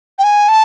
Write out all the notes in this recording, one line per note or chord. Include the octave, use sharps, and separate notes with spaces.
G5
G#5
A5